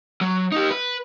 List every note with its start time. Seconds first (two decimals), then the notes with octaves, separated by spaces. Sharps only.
0.21 F#3
0.52 D#4 G4
0.70 B4